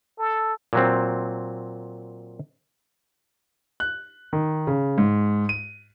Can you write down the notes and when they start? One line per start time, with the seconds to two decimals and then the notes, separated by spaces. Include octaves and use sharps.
0.18 A4
0.73 A#2 F#3 C4
3.80 F#6
4.33 D#3
4.67 C#3
4.98 G#2
5.49 D#7